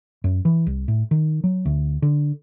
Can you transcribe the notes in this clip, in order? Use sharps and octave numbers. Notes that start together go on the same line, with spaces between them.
F#2
E3
C2
A2
D#3
F#3
D2
D3